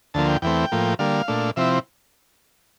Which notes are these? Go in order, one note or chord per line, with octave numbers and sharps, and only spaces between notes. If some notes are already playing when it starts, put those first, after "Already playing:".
D2 D3 F3 A#3 A5
G5
E2 E3 A3 C4 G5
A2 F3 A#3
D3 G3 A#3 F5
A#2 A3 D4
C3 F3 C4 E4 E5